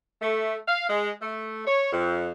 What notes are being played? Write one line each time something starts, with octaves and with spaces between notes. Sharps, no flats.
A3
F5
G#3
A3
C#5
F2